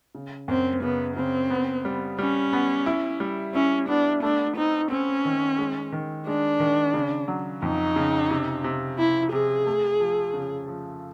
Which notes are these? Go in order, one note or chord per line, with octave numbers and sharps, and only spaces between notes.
C#3
F#2 C4
C#3 B3
C#3 C4
B3
G3
G3 C#4
B3
E4
G3
C#4 E4
B3 D4
A3 D4
C4 D#4
C4 C#4
D#3
G#3
D#3
G#3 D4
D#3
C#3
F#3
F2 D#4
C#3
C3
C3
C3 E4
C3 G#4
A3
F3
C#3
F3